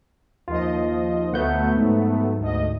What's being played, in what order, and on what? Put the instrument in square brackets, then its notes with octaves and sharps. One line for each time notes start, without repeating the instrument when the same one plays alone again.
[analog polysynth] D#2 F3 D#5 [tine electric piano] F4
[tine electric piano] D2 F#5 G6 [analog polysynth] F#3 A3 B3
[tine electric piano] G#2
[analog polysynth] D2 D#5